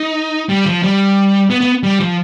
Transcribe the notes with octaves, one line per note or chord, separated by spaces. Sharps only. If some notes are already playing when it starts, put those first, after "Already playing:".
Already playing: D#4
G3
F3
G3
B3
B3
G3
F3